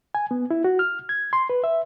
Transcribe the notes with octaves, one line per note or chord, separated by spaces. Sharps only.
G#5
B3
E4
F#4
F6
G#6
C6
B4
E5